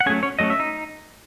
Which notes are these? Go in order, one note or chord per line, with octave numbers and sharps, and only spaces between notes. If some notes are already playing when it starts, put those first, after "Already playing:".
F#5
F#3 A3 C#4 G#4 G#5
C#4 C#5
F#3 A3 C#4 D#5
E5
D#4